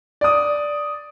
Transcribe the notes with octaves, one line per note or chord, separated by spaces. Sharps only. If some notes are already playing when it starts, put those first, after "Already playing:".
D5 D#6